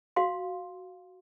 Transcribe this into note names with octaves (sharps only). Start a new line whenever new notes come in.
F#4 F5 C6